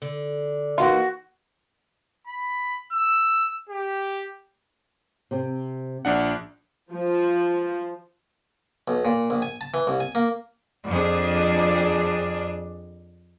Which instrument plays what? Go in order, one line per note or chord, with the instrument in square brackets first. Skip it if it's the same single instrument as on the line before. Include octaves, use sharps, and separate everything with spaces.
[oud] D3
[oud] E3 A#3 D#4 [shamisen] F4 [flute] F#4
[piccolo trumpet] B5
E6
G4
[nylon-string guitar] C3 C4
[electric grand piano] A#1 D4 F#5
[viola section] F3
[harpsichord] B1
A#2
A#1
G#5
A5
E3
C2
G#5
A#3
[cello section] F2 D4 G#4